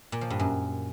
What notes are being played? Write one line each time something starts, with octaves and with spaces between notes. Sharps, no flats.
A#2
F3
G2
F#2